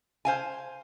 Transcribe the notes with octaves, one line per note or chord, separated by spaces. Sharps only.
C5 F5 G#5